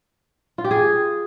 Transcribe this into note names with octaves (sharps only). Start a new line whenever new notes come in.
F4
G4
G#4